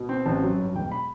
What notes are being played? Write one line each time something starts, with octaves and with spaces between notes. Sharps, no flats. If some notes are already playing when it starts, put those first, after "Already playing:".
Already playing: B2
C4
A1 A5
F#3
G2
E1 G5
B5